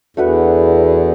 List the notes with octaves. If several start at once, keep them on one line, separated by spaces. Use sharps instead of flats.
E2 A3 D4 F#4 B4